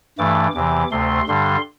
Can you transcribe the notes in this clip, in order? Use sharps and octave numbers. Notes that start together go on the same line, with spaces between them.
G2 E3 A3 D6
E2 C3 E3 D6
D2 C3 A3 C6
G2 D3 G3 C6